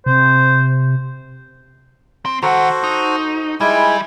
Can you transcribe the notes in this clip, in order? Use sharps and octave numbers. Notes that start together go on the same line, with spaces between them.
C3 C5
C4
D#3 F#4 A4 C5 F#5
D#4
G3 G#3 E4 G#5